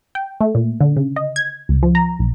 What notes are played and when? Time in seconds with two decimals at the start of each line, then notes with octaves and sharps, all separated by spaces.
0.15 G5
0.41 A3
0.55 A#2
0.81 D3
0.96 C#3
1.16 D#5
1.36 G#6
1.69 C#2
1.83 F3
1.95 A#5
2.19 B1